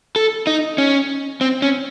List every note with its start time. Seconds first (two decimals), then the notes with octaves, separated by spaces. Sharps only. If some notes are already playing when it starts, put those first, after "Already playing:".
0.16 A4
0.47 D#4
0.78 C#4
1.41 C4
1.62 C#4